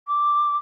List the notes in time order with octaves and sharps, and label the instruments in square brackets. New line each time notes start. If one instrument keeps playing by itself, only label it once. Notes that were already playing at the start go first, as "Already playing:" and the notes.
[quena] D6